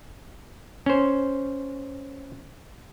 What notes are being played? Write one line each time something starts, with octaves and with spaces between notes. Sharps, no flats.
C#4 C5